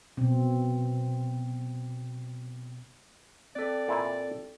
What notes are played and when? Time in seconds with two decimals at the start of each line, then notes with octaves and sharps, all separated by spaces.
0.17 B2 C4
3.56 C4 A4 D5
3.88 A#2 E4 G#5